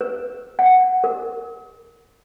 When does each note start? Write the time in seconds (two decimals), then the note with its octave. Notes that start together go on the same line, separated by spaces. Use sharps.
0.01 B4
0.59 F#5
1.04 A#4